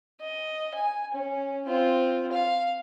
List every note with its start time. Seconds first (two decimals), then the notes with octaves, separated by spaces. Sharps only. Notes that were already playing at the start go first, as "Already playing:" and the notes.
0.21 D#5
0.75 G#5
1.14 C#4
1.67 C4 F4
2.32 F5